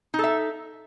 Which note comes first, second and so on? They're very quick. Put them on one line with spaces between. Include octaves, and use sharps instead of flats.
D#4 A4 E5